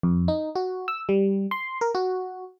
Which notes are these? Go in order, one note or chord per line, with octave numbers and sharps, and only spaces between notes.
F2
D#4
F#4
E6
G3
C6
A#4
F#4